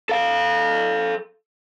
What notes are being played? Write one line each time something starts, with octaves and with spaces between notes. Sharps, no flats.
A4 F5